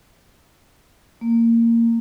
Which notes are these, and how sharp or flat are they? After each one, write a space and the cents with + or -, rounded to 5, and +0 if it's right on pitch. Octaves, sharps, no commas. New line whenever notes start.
A#3 -15